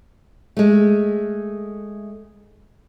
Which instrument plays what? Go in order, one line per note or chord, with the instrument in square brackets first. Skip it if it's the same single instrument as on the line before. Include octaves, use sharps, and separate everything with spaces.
[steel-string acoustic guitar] G#3 A3